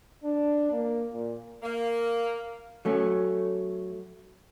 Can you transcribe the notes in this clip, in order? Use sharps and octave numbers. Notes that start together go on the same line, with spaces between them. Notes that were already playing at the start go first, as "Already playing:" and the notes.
D4
A#3
A#2
A#3
F#3 A3 C#4